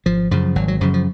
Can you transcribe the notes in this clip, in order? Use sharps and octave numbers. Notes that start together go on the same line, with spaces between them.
G#1 F3
F#2 C#3 F3
G#1 F#3
F#3
F#2 C#3 F3
F3